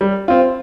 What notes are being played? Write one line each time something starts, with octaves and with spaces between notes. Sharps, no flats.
G3
C4 F4